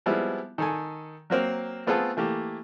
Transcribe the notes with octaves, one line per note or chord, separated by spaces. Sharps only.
F3 G3 G#3 B3 C4 E4
D#3 A4 G#5
F#3 A#3 C4 A#4
A3 B3 C4 F4 G#4 A4
E3 A3 A#3 G4